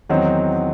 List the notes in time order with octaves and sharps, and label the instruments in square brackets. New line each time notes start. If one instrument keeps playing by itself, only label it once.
[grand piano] E2 D#3 F#3 C4 D#4